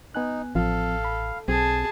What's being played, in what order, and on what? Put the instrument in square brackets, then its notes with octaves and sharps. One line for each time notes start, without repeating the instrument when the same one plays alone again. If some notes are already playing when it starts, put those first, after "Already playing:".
[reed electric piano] B3 G#5 F#6 [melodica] D#4
[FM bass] A1 [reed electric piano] F3 C4 [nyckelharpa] A4 [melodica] F5
[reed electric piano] B5
[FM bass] B1 [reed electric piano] C4 [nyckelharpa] G#4 A5